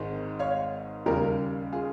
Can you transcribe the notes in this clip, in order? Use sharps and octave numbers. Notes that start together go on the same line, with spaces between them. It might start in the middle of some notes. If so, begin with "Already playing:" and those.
Already playing: G#1 G#2 D#3 G#3
C#5 F5
D#2 C#3 G3 G4 A#4
F4 G#4